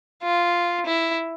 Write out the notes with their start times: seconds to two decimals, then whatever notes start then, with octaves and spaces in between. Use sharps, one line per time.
0.23 F4
0.86 E4